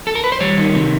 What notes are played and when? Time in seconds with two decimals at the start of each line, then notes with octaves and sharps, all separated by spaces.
0.07 A4
0.15 A#4
0.24 B4
0.32 C5
0.40 G3 C#5
0.58 D#3
0.75 C3